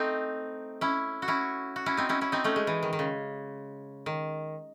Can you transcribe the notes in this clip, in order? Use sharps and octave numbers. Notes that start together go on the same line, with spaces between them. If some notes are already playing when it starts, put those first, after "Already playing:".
Already playing: A3 C4 D#4
C#4 E4
F#4
C#4 E4
F#4
C#4 E4
C4 D#4
C#4 E4
C#4 E4
C4 D#4
A3 C#4
G#3
E3
D#3
D#3
C#3
D#3